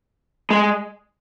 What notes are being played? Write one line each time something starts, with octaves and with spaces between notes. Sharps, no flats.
G#3